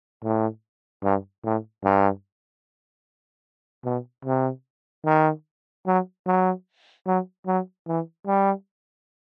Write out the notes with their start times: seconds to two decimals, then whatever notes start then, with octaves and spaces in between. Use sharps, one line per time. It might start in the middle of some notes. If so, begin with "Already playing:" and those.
0.23 A2
1.03 G2
1.44 A2
1.84 G2
3.85 B2
4.25 C3
5.05 D#3
5.86 F#3
6.27 F#3
7.07 F#3
7.47 F#3
7.87 E3
8.27 G3